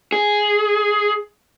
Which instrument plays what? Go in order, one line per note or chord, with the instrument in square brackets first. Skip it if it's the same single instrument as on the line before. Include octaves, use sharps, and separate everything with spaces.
[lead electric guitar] G#4